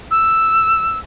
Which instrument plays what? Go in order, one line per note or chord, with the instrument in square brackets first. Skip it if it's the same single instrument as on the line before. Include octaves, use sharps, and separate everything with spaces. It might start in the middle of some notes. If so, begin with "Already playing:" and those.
[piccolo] E6